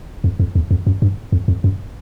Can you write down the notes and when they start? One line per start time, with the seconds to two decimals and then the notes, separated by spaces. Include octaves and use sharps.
0.24 F2
0.40 F2
0.55 E2
0.71 F2
0.87 F#2
1.02 G2
1.32 F2
1.48 F2
1.64 F#2